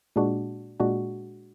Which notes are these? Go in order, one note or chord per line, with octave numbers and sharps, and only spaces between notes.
A#2 G#3 D4 F#4
A#2 G#3 D4 F#4